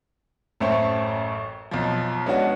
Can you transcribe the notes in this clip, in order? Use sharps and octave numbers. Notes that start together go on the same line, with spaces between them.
A1 F#2 A3 C5 C#5 G5
B1 F3
G#3 B3 C#4 D4 F#4